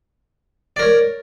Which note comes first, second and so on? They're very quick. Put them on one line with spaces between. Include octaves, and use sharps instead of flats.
D5 A#4 C#5